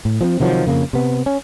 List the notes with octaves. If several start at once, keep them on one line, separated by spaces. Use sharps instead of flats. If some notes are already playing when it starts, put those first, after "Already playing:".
A2
F3 B3 C4
C3 D#3 F3 F#3
F2 C#3 A#3
C3 B3
C#4